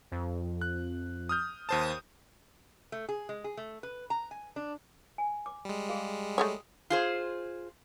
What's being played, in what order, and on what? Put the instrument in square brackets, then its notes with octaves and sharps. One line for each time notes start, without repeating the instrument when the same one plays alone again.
[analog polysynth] F2
[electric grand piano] F#6
D#6 F6 G6
[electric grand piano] D#2 C5 A5 [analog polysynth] D#6
[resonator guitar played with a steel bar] A3
G#4
G#3
G#4
A3
B4
A#5
G#5
D4
[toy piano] G#5
D6
[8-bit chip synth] G3 G#3
[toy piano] G#4 F5
[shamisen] A3 G#4 C#5 [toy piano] D#6
[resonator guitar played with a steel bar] F4 G#4 C5